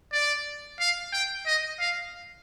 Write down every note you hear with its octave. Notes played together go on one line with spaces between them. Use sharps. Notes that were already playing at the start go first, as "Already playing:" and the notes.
D5
F5
G5
D#5
F5